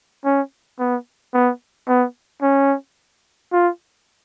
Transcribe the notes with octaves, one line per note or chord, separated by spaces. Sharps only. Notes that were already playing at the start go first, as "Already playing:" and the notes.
C#4
B3
B3
B3
C#4
F4